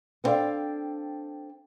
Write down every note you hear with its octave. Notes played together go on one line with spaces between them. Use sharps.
B3 C4 D4 A4 F5 G5